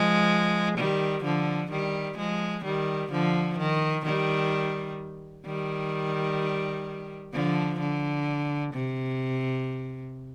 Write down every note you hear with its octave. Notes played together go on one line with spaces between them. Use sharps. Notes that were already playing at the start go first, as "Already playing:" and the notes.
Already playing: F3 G#3
D#3 G3
D3 F3
D#3 G3
F3 G#3
D#3 G3
D3 F3
D#3
D#3 G3
D#3 G3
D3 F3
D3
C3